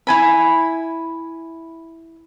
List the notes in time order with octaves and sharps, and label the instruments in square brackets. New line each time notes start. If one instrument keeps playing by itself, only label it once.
[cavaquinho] E4 G#5 B5